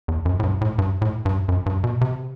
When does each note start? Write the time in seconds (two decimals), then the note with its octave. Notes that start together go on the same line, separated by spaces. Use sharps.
0.08 E2
0.25 F#2
0.40 A2
0.44 G2
0.61 A2
0.78 G2
1.02 A2
1.25 G2
1.48 F#2
1.66 G2
1.84 B2
2.01 C3